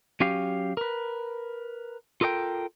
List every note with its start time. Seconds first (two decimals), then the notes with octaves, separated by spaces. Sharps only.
0.20 F#3 C#4 G4 F5
0.77 A#4 B4
2.21 F4 A4 A#4 D5 G5